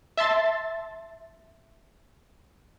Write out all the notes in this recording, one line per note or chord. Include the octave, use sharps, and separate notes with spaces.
E5 A5 C6 A6